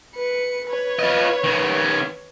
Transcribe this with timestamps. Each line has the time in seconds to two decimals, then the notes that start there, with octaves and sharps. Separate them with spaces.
0.16 B4 C#7
0.67 B4 C#5
0.99 F4 D#5
1.44 D#3 C#4